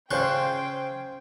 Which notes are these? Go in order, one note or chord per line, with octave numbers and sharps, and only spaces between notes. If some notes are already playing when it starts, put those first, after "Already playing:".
C#3 F4 C5 G5 C#6 F#6